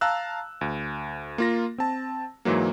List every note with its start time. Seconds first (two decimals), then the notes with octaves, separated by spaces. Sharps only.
0.01 F5 A5 A#5 E6 F#6
0.61 D2
1.38 A#3 F4 A#6
1.78 C4 A5
2.45 G#2 E3 F#3 A#3